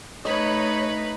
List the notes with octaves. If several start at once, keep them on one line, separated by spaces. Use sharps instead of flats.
A3 D#4 B4 C#5 D#5 B5